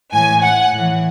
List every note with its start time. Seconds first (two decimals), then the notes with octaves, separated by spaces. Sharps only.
0.12 A2 E3 G#5
0.42 F#5
0.73 A2 E3